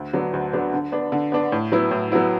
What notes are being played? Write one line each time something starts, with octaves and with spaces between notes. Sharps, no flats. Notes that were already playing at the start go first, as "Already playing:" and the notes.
Already playing: D2
D3 F#3 B3 D4
D2
D3 F#3 B3 D4
D3
B3 D4
D3
B3 D4
A2
F#3 B3 E4
A2
F#3 B3 E4